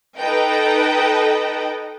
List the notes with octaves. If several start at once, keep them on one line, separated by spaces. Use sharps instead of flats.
D#4 A4 B4 D#5 G5